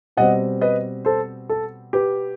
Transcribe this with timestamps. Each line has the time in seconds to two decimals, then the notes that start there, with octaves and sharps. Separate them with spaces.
0.17 B2 G3 C4 D#5 F#5
0.61 B4 D#5
1.05 A4 C5
1.49 A4
1.93 G4 B4